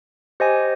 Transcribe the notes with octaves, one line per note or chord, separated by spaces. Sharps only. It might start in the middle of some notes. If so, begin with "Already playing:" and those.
G4 C5 D#5 G#5